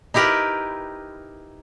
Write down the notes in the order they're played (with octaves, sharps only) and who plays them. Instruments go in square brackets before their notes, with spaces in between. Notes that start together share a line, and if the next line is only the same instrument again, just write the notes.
[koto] D#4 E4 G4 A#4 B4